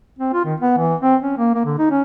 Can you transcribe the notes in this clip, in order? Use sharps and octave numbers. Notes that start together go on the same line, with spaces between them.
C4
F4
D#3
B3
E3
C4
C#4
A#3
A#3
D3
D#4
C#4